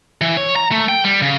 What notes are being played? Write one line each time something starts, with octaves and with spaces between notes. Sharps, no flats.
E3
C#5
A#5
A3
G5
G3
C#3